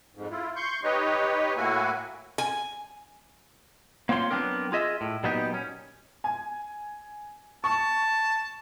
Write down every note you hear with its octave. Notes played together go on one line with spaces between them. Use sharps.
F2 G#2
E4 F4
C6 C#6 G6
D#4 G4 B4 C#5 D#5
A2 A#3 E4 F#4 G#5
G#5
A#3 C4 F4 C#5 C6
F#3 B3 C4 D4 A#4
F4 G#4 D#5 E5
A2
A#2 F#3 B3 D#4 G4
C#4
G#5
A5 C#6